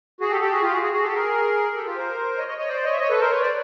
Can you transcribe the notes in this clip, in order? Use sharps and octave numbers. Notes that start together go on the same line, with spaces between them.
F#4 G#4
G4 A4
G4 A4
F#4 G#4
F4 G4
F#4 G#4
F#4 G#4
F#4 G#4
G4 A4
G#4 A#4
G4 A4
F4 G4
A#4 C5
C#5 D#5
C#5 D#5
C#5 D#5
C5 D5
C#5 D#5
E5
C#5 D#5
A4 B4
A#4 C5
B4 C#5
C5 D5